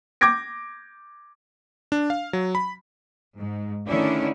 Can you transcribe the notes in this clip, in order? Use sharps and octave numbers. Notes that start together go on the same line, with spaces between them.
D6 G6 G#6 A#6 D7
D4
F5
F#3
B5
G#2
D3 D#3 A3 C#4 D4 E4